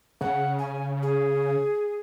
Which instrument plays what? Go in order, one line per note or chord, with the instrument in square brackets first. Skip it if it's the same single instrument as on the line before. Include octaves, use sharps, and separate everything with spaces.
[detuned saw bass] C#3 [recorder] F#5
[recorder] G#5
G#4